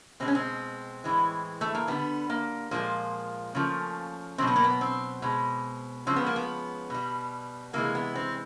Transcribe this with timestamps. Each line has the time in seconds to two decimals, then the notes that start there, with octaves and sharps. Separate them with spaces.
0.20 B2 G#3 C4
0.28 C#4
0.35 C4
1.04 A2 E3 G#3
1.61 A3
1.75 A#3
1.87 D3 G3 B3
2.30 A#3
2.71 A#2 F3 G#3 A#3
3.55 C#3 F3 A3
4.38 B2 F#3 A3 C4
4.47 B3
4.56 A#3
4.64 B3
4.81 C4
5.22 B2 G#3
6.07 C#3 F3 G#3 C4
6.16 B3
6.27 A#3
6.36 B3
6.90 B2 G3
7.73 C3 E3 G#3 A#3
7.95 B3
8.15 C4